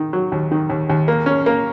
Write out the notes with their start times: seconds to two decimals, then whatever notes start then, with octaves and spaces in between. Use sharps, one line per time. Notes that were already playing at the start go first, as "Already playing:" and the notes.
Already playing: D#3
0.13 F#3
0.32 D#2
0.51 D#3
0.70 D#2
0.89 D#2
1.08 A#3
1.26 C#4
1.46 A#3